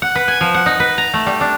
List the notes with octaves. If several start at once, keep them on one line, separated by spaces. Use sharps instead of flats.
F#5
B4
G#5
F3
F#5
D#4
B4
A#5
A3
G3
D4